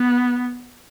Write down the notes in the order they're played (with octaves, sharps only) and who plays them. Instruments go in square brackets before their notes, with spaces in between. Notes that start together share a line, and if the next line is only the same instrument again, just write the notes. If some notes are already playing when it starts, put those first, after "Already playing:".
Already playing: [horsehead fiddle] B3